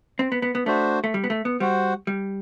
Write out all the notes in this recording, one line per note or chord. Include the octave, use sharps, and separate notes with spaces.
C4
B3
B3
B3
A3 D4 F#4 C5
A3
G3
B3
A3
B3
G3 F#4 C5 F#5
G3